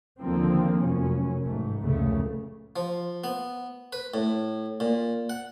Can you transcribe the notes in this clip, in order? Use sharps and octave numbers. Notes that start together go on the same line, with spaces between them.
D#2 D3 F3 A#3 C4
F1 F#2 C#4
A1 G#2 A3
F1 C#2 A#2 C#3 A3
F3
B3
B4
A2
A#2
F#5